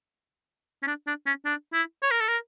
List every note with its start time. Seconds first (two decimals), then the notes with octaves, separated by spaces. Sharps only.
0.83 C#4
0.87 D4
1.07 D4
1.26 C#4
1.45 D4
1.73 E4
2.02 C#5
2.11 A#4
2.20 A4
2.28 A#4